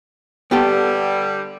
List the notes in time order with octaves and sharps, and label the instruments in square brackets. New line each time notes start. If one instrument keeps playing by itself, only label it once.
[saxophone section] D3 G3 [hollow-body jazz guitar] B3 G4 A4